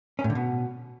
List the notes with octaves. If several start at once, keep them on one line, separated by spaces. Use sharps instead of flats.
C#4
A2
D3
B2